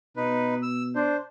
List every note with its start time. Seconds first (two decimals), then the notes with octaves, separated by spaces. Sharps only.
0.16 B2 D#4 B4
0.62 E6
0.95 D4 C5